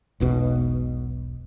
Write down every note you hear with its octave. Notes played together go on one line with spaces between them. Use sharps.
E1 B1 B2